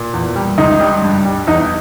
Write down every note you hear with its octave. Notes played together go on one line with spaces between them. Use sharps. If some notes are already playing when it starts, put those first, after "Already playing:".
Already playing: A#2
E2
G3
C#2 D#4
G3
G2
G3
E2 D#4